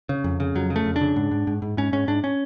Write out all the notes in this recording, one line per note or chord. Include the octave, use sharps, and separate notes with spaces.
C#3
F2
C#3
F2 F#3
C#3
A3
F2
D4
C#3
G#2
G#2
G#2
G#2
G#2 C#4
G#2 C#4
G#2 D4
C#4